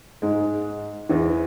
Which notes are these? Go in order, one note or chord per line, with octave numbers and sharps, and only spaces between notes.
G#2 G#3
E2 E3